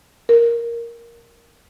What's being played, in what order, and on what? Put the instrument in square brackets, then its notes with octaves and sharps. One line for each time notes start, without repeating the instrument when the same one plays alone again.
[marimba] A#4